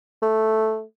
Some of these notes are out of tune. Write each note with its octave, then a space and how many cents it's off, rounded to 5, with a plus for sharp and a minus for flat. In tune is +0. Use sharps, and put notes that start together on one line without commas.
A3 -5